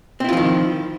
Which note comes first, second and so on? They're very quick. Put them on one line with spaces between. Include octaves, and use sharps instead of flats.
C4 E4 F4 F3 D#3